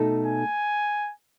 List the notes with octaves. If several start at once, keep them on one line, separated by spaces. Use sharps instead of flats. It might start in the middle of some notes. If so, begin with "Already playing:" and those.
Already playing: B2 A3 D#4 A4
G#5